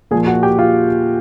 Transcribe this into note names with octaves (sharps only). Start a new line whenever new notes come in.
A#2 F3 A#3 G#4 G#5
F#4 F#5
G4 G5
F4 F5